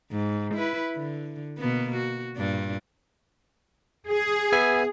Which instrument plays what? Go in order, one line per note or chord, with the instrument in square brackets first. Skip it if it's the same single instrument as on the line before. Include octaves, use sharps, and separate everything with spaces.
[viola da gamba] G#2
E4 B4
D3
B2 A#3 B3
F#4
G2 A#2 D4
[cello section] G#4
[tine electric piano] B3 E5 G#5